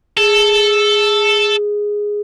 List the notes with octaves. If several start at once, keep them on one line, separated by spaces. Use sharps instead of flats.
G#4 A4